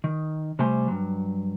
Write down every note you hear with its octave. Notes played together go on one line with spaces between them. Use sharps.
D#3
C3 G3 A3 C5 G#5 C6
G2 F#3